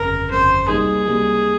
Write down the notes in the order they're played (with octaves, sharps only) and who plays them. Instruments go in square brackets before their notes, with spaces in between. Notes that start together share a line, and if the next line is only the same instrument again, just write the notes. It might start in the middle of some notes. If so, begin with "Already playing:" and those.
Already playing: [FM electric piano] G1 F2 C#3 [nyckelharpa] A#4
[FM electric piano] G1 F2 C#3 [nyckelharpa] C5
[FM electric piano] C#2 C3 G3 A#3 D#4 [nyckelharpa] G#4
[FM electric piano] C#2 C3 G3 A#3 D#4